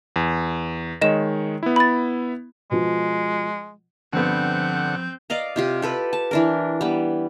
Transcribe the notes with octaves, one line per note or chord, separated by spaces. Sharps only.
E2
D#3 G#3 C#5 D#5 E7
B3 E4
B5 A6
B2 F3 G#3
G2 D3 F3 B3 C4 F#5 G6
D5 D#5 F5 A#5
C3 F4 G4
G4 A4 B4
A5
E3 D4 A#4
G3 B3